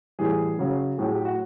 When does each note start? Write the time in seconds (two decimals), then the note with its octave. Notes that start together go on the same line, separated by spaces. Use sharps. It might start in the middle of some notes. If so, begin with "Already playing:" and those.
0.19 A2 E3 G3 G#4
0.59 C#3 F#3
0.98 A2 F#3 G#4
1.12 G4
1.25 F#4